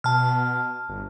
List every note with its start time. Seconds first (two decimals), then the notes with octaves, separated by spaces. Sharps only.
0.04 B2 A5 F6
0.89 G1